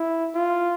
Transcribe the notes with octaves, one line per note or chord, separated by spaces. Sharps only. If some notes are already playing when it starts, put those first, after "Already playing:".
Already playing: E4
F4